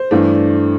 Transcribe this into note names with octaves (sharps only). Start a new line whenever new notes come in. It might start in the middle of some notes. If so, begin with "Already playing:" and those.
Already playing: C5
G2 E3 A3 D4